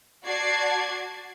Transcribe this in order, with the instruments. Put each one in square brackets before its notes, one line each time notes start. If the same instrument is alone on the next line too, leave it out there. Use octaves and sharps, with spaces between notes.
[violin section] F#4 D5 A5 G#6 C7